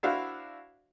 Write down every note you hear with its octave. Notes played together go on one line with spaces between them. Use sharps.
D4 E4 F#4 C5 E5 F5